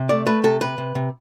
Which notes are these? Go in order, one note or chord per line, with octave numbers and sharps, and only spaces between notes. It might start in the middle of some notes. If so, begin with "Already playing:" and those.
Already playing: C3
A3 D5
A3 B4
C3 A4
C3 B4
C3
C3